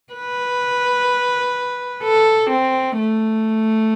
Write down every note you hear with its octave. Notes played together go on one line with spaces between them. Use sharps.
B4
A4
C4
A3